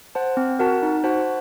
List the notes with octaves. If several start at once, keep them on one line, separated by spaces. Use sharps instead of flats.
C5 F#5 A5
C4
F#4 A#4 F#5 A5
D#4
F#4 C5 F#5 A5